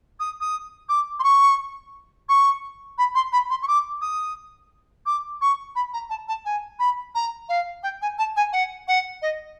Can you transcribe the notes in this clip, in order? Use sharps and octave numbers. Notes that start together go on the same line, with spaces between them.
D#6
D#6
D6
C6
C#6
C#6
B5
C6
B5
C6
C#6
D6
D#6
D6
C#6
B5
A#5
A5
A5
G#5
B5
A#5
F5
G5
G#5
A5
G#5
F#5
F#5
D#5